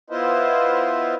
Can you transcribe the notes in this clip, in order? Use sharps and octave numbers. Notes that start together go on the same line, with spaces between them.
B3 E4 F4 B4 C5 D#5